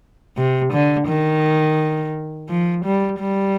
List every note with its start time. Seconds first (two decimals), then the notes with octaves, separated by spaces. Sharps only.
0.37 C3
0.72 D3
1.07 D#3
2.49 F3
2.84 G3
3.19 G3